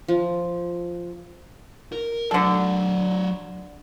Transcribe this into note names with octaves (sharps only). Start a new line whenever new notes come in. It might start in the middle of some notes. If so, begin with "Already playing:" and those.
F3
A#4
D3 F#3 A4 D5